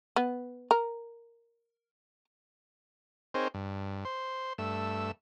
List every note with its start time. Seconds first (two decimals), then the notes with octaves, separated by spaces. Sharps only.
0.16 B3
0.71 A#4
3.34 C4 D#4 G#4 A#4 C5 C#5
3.54 G2
4.05 C5 C6
4.58 G2 A3 E6